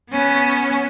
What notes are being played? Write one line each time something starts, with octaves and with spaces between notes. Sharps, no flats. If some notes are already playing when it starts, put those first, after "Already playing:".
B3 C#4